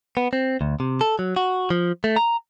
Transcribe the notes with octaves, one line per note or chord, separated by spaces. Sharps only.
B3
C4
D2
C3
A4
F#3
F#4
F3
A3
A#5